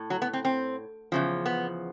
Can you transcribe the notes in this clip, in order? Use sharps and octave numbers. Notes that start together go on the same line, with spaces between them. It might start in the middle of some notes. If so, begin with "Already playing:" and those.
Already playing: A2
F#3
B3
C4
C4
E2 C#3 F3
B3